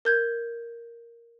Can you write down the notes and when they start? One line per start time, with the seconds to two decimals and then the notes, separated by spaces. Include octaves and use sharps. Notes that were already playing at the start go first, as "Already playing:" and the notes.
0.05 A#4 G6 G#6